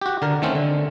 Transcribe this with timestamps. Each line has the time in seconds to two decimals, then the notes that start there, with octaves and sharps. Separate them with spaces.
0.02 F#4 G4
0.22 D3 A#4
0.42 D#3 A3 C4 C#4
0.55 D3